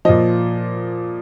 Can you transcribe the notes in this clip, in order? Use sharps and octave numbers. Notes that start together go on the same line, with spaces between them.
A#2 F3 D#5